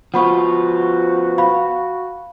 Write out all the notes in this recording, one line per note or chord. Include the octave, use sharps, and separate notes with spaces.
F3 B3 F4 F#4 F#5 B5 C#6
F5 B5